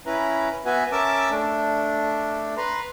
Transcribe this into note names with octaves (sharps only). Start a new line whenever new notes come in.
C#4 E4 B4 A#5
B3 F#4 B4 E5 G#5
C#4 A#4 E5 A5 D6 E6
A3 D4
B4 A#5 C6